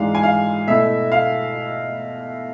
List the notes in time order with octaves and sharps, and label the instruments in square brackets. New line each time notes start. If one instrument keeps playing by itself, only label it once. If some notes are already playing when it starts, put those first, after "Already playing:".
Already playing: [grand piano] G#2 E3 G#3 D4 F5
G#5
F5
B2 A3 E4 E5
F5